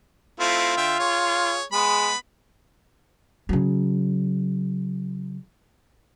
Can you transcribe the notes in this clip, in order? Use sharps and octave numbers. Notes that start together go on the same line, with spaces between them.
A3 C4 E4 F4
D3 E5 G5
G#4 C#5
G#3 B3 B5
C#3 F#3